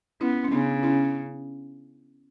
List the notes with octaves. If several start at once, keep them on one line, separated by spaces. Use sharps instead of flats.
B3 C#4 E4
C#4
C#3 B3 D4
C#4 E4